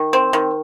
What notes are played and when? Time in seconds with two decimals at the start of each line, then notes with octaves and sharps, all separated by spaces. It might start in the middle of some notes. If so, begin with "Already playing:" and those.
Already playing: D#3
0.13 C4
0.33 D#3